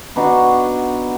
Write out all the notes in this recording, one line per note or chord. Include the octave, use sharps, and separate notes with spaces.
B3 D4 D#4 F#4